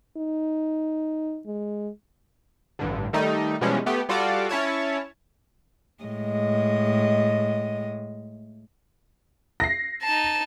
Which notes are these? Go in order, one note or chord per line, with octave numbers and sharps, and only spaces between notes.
D#4
G#3
A1 G2 D3
D#3 G3 A3 D#4
B2 E3 F3 G3 G#3 C#4
A3 B3 G4
G3 F4 F#4 A4 D5
C#4 E4 C#5 A5
A2 G#3 D#5
A#6 C7
D#4 A5